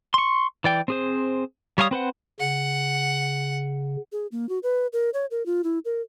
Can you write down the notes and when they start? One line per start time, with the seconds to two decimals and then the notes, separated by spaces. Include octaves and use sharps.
0.14 C6 C#6
0.64 E3 D5 G5
0.88 C4 G#4 C5
1.78 G3 C#5 F5 G#5 D#6
1.91 C4 B4 C5 F#5
2.40 C#3 F#5
4.12 G#4
4.32 A#3
4.49 F#4
4.63 B4
4.93 A#4
5.14 C#5
5.31 A#4
5.46 F4
5.64 E4
5.85 A#4